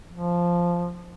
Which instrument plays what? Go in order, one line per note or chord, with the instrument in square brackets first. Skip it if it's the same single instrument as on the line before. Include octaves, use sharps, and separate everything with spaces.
[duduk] F3